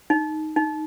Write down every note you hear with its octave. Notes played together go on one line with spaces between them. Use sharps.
D#4
D#4